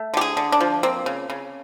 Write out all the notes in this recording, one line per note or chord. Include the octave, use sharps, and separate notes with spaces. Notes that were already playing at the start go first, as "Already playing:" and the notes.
Already playing: A3
D3 G4
G#4
D3
D4
F3
A#3 C4
C#3
C#3